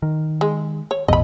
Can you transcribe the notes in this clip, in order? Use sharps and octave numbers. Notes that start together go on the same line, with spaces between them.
D#3
G#3
C#5
A1 E2 B2 D#5 B5